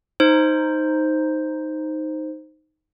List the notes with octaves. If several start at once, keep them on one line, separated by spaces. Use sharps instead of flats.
D#4 C5